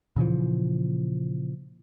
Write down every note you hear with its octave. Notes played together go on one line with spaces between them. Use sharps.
A#2 C#3 E3 F3